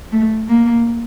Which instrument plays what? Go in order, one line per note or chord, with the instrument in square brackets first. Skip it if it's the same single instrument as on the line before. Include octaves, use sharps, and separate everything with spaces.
[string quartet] A3
A#3